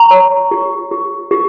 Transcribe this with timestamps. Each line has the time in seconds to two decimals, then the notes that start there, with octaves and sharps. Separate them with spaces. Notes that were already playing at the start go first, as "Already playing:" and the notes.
Already playing: A#5 C#6
0.11 C#5
0.51 G4
0.91 G4
1.31 G4